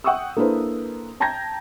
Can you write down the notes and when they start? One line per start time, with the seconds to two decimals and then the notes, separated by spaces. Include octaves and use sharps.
0.04 F#5 G5 C#6 D#6 E6
0.37 A#3 D4 E4 A4 B4 C5
1.20 G5 A5 A#5 G6 G#6 A#6